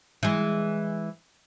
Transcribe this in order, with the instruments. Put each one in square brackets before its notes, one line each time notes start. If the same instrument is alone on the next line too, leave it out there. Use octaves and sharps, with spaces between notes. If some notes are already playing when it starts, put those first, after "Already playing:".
[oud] E3 G#3